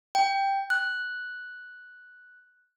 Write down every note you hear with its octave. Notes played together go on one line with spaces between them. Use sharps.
G5
F#6